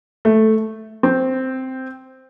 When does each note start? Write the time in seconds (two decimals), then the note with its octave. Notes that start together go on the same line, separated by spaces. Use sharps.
0.25 A3
1.03 C4